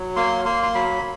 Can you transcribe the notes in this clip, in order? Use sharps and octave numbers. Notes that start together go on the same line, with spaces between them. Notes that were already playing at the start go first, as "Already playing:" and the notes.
Already playing: F#3
A#3 C6
A#3 C6
C6
F#3 B5